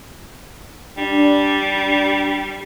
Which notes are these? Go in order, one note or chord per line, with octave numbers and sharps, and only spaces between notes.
G3 D4
D4